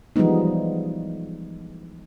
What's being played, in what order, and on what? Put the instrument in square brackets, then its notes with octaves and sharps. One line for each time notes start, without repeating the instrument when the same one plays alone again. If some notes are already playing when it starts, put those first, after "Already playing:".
[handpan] E3 F3 G3 G#3 B3 D#4